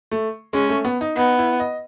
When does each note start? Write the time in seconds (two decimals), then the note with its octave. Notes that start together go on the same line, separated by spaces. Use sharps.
0.11 A3
0.53 G#3 C#4
0.69 A3
0.85 B3
1.01 D#4
1.17 B3 D#4
1.38 E4
1.60 D#5